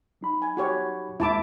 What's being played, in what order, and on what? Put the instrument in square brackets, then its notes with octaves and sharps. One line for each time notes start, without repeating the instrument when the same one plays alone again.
[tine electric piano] F#3 D#4 B5
[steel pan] G#5
F#4 G4 C#5
[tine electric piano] D#2 G#3 [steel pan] E4 A5 D6